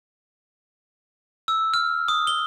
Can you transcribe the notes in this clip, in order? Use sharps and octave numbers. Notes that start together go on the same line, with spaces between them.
E6
F6
D#6
G7